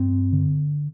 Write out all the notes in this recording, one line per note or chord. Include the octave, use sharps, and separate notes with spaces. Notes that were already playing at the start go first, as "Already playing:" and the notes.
Already playing: G2 C4
D3